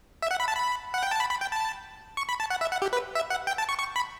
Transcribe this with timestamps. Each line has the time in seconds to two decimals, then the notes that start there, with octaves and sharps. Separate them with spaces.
0.22 E5
0.31 F#5
0.40 B5
0.48 A5
0.55 B5
0.94 F#5
1.03 G5
1.11 A5
1.20 B5
1.30 B5
1.41 G5
1.52 A5
2.17 C#6
2.29 B5
2.40 A5
2.50 F#5
2.61 E5
2.72 F#5
2.82 G4
2.93 B4
3.15 E5
3.30 F#5
3.47 G5
3.58 A5
3.69 C#6
3.79 C#6
3.96 B5